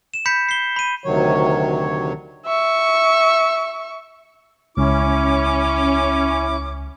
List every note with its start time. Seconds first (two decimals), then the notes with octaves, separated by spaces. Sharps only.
0.14 E7
0.26 B5 G6 B6 C#7
0.49 C7 G7
0.76 B5 D#7
1.04 D2 C3 D#3 F#3 C#5
2.45 E5 C#6
4.77 C#2 C#4 E4 D6